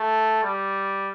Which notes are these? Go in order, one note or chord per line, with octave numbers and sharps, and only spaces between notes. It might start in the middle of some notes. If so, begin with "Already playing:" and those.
Already playing: A3
G3